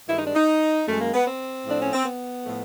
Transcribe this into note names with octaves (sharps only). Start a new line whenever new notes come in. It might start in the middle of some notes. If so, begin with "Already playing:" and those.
G2 D#3 G#3 E4
D#4
D4
D#4
F#2 D#3 G#3 A3
A#3
B3
C4
A2 F3 A3 D4
C#4
C4
B3
A2 F3 A3